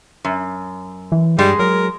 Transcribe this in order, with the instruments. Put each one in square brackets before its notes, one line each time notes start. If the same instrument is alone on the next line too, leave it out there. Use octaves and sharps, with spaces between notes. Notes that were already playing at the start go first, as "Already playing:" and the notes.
[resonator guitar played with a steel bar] F#2
[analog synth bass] E3
[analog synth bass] G2 [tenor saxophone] G3 [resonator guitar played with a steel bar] G#3
[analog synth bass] F#3 [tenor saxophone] A#4